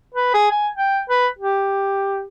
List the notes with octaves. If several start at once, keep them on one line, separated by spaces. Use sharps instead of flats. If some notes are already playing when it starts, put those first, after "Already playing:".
B4
G#4
G#5
G5
B4
G4